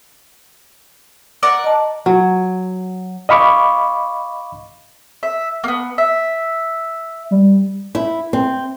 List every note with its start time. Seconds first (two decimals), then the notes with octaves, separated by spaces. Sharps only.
1.43 A#4 D5 F#5
1.64 D#5 A5
2.06 F#3
3.29 D#5 F5 B5 C#6 D6
5.23 E5
5.64 A#3 B3
5.98 E5
7.31 G3
7.95 E4
8.33 C4